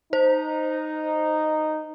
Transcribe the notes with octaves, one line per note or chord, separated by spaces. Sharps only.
D#4 C5